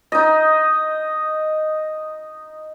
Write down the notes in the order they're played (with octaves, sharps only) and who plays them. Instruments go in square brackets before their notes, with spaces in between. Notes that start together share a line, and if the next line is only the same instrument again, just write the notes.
[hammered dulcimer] D#4 D#5